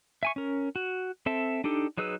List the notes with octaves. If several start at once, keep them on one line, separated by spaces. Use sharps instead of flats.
E5 G#5 C#6
C#4 A#4
F#4
C4 A4 E5 A5
D4 D#4 G4 A4
F#3 D#4 G#4 B4 E6